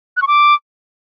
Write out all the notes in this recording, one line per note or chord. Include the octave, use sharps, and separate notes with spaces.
F#6
C#6
D6